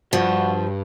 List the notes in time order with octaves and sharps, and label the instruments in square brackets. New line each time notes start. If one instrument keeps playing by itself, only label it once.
[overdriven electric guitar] G2 [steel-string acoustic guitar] F3 [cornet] F#4